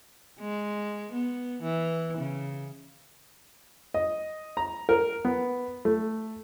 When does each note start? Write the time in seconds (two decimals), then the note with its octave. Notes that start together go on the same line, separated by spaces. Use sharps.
0.40 G#3
1.12 B3
1.63 E3
2.18 C#3
3.94 D#5
4.57 A#5
4.89 A#4
5.25 B3
5.85 A3